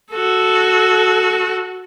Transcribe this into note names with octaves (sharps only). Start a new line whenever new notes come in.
F#4 A4